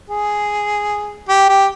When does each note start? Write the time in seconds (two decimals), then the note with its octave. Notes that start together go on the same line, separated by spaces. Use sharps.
0.10 G#4
1.29 G4
1.49 G4